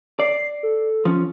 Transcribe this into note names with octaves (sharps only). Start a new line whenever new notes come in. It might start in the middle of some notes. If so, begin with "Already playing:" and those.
D5 C7
A4
F3 C#4